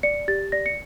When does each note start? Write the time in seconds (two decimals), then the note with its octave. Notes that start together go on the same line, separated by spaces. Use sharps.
0.03 D5 C#7
0.28 G4 A6
0.52 D5 A#6
0.66 C#7